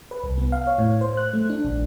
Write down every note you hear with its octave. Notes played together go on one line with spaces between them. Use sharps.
B4
C2
B3
F5
C#5
A2
C5
F#6
A3
D4
A#1